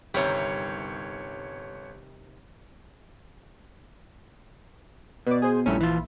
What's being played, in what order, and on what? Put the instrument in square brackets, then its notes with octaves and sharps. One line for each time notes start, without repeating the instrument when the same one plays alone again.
[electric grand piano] G1 C#5 [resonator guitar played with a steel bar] C3 D#3 G3
[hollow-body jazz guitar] B2 [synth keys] B4 D5
[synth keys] G#4 C5
[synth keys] A#1 E4 [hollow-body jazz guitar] G2 A3 C#4
[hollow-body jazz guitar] E3 F4